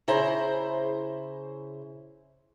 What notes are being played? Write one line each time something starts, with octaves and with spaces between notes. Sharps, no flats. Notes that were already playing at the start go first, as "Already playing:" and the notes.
C#3 E4 C5 A#5